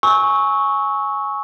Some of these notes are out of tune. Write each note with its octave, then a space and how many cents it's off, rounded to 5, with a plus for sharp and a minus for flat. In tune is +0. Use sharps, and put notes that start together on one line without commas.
G#5 +5 C#6 +0 E6 -30